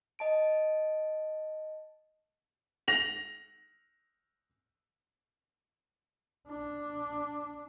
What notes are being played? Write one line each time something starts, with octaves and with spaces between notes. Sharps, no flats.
D#5 A5 D7
A#6 F7 F#7
D4